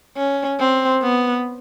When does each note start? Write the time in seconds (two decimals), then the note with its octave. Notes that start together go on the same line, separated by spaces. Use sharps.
0.16 C#4
0.59 C4
1.02 B3